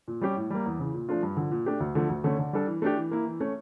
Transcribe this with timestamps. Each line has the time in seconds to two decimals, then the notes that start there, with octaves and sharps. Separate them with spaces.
0.08 A#2
0.21 G3 C#4 G4
0.36 A2
0.50 G3 A#3
0.66 E2
0.79 C#3 E3
0.94 A#2
1.09 F3 A3 D4 F4
1.23 G2
1.37 D3 F3
1.51 A#2
1.66 A3 D4 G4
1.80 D2
1.95 D3 F3 A3
2.09 D2
2.24 D3 A3 C#4
2.39 D3
2.53 G3 D4 A4
2.67 E3
2.82 A3 D4 G4
2.97 E3
3.11 A#3 E4
3.25 E3
3.40 A3 C#4